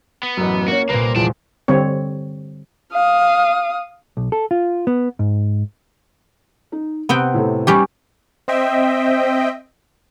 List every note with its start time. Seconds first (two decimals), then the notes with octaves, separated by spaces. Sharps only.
0.23 B3
0.37 A1 F#2
0.68 A#3 C#4 F#4
0.89 C2 A#2 A#3 B4
1.16 E2 F3 G#3 D5 A5
1.68 D3 G3 C4 C#5
2.92 F5 D#6
4.17 B1
4.32 A4
4.51 F4
4.87 B3
5.19 G#2
6.72 D#4
7.09 C3 B3 C4 G5
7.34 A2 C3 A4
7.67 G3 C#4 G4
8.48 C4 C5 D#5 E5 G5